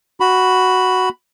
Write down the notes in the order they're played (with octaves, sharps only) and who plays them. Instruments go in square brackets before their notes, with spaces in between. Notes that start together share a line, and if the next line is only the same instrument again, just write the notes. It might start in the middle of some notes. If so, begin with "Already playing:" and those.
[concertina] F#4 B5